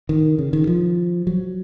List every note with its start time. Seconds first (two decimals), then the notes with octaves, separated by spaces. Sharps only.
0.09 D#3
0.39 C#3
0.53 D#3
0.67 F3
1.27 F#3